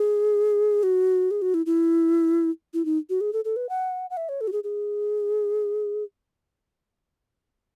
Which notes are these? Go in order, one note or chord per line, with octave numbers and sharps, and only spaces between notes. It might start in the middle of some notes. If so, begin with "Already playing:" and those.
Already playing: G#4
F#4
G#4
F#4
E4
E4
E4
D#4
F#4
G#4
A4
A4
B4
F#5
F#5
E5
C#5
A4
F#4
G#4
G#4